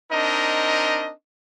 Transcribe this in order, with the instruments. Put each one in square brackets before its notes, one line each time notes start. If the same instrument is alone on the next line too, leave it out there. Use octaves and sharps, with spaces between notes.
[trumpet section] C4 D4 D#4 A#4 D#5